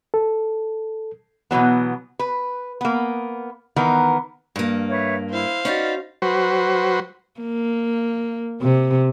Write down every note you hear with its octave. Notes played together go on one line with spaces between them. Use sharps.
A4
B2 E3 F#3 B3
B4
A#3 B3
D#3 E3 B3 A#4
G2 A#3
B4 C#5 E5
E4 C5 F5
C#4 D#4 F#4 D5 B5
F#3 F#4 B4 C5
A#3
C3